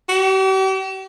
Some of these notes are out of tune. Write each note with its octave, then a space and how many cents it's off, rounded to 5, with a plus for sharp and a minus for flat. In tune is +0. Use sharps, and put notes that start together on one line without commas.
G4 -45